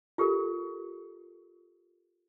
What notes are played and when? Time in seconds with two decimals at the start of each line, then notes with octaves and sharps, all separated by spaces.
0.18 F4 G4 A4 A#4